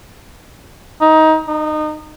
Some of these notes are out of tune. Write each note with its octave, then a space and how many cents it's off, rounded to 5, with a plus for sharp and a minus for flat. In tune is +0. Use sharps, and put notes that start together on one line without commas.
D#4 +20
D#4 -25